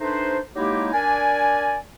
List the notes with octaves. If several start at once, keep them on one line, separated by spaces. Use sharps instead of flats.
A3 D4 D#4 B4 C5
F#3 G#3 A#3 D#4 E4 G4
D4 A#4 D5 G#5